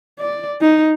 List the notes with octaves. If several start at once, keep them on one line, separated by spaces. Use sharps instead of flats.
D5
D#4